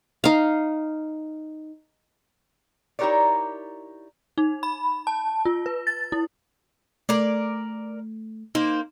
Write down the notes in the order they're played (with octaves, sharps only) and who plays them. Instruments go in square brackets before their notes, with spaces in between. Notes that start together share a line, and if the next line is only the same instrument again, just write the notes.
[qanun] D#4 F5
[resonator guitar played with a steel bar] D#4 E4 G4 A#4 C#5 D5
[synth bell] D#4
B5
A5
F4
B4
A6
E4
[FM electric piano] A3 [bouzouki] A#4 D5
[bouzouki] A#3 C5 [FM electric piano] D#4